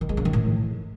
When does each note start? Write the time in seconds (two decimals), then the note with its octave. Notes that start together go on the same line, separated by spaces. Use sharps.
0.01 D#3
0.09 G#3
0.17 C#3
0.25 D#3
0.33 A2